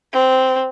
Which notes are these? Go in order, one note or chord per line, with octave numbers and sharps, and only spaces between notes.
C4